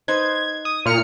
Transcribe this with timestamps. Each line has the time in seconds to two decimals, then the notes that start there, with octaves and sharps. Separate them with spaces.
0.08 D#4 B4 C5 G#6
0.65 D#6
0.86 A#2 F6 C#7